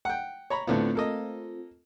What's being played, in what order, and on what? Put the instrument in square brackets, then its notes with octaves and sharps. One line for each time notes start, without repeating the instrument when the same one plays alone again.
[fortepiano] F#5 G5
C#5 A#5 B5
[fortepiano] A2 D3 B3 [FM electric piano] A3 C4 F4
[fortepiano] A#3 A4 D#5